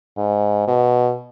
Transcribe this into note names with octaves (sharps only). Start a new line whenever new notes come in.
G#2
B2